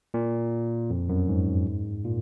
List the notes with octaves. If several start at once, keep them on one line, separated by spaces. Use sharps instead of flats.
A#2
F2
F#2
G#2
A#2